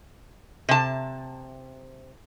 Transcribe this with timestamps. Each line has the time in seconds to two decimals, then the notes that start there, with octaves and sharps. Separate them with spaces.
0.69 C3 A5